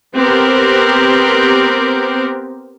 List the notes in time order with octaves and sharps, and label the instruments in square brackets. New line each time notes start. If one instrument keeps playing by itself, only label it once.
[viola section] B3 C4 G4 A#4